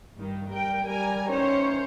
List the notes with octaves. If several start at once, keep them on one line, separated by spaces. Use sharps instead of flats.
G2 D#3
G3 A#4 G5
G3 A#4 G#5 A#5
D#3 E3 C#4 C5 C#5